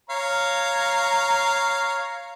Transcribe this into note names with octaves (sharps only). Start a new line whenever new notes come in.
C#5 F5 A#5